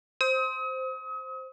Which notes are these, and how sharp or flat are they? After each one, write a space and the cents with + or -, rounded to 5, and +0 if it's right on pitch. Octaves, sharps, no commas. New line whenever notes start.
C5 +0 D#6 +40